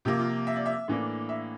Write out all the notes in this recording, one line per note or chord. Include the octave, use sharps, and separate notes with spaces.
C3 F3 A#3 G4
F4
E5
D5
E5
A2 E3 A#3 D4
E5